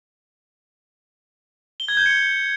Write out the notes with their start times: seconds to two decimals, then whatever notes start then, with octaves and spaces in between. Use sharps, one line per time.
1.80 G7
1.88 G#6
1.97 G6
2.06 C#7